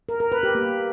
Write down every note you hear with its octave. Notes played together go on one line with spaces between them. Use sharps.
A#4
A#4
B4
G4
A#3